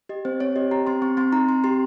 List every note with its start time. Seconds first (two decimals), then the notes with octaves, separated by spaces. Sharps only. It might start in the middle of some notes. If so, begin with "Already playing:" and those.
0.09 G4 D#5
0.25 C4 C5
0.40 C4 C#5
0.56 G4 D#5
0.71 G4 A#5
0.87 C4 C6
1.02 C4 C#6
1.17 C4 C6
1.32 D#4 A#5
1.48 C4 C6
1.64 G4 C6